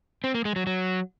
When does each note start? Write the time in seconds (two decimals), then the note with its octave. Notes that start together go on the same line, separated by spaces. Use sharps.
0.24 C4
0.34 A#3
0.45 G#3
0.56 F#3
0.67 F#3